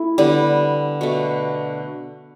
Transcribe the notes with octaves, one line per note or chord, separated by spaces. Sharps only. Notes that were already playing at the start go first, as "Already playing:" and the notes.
Already playing: A3 E4
D3 G3 B3
B2 A3